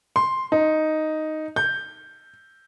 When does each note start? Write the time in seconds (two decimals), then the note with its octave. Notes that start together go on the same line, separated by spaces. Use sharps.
0.16 C6
0.52 D#4
1.56 G6